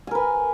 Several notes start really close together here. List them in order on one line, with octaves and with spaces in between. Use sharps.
G#5 A#4 B4